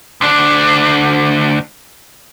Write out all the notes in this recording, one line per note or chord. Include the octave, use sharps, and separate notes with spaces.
D2 D4